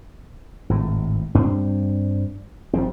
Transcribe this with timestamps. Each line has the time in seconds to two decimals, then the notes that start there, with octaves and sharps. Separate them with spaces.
0.69 G#1 A2
1.35 G2 C4 D4
2.73 G1 F3 C4